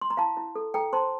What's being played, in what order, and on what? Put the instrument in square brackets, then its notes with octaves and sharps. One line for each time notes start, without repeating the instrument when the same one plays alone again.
[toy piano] C6
A#5
E4 F5 A5
E4
A4
A4 G5 A#5
C5 A5 C6